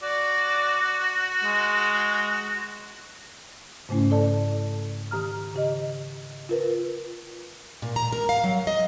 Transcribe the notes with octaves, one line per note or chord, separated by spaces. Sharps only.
F#4 D5
G#3
G#2 C#3 A3 C#4 E4
A4 D5 A5
D#3 G4 A#5 F6
C#3 G4 D#5
F4 A#4 B4
A#2
A#5
A#4
F5
F#3
D#5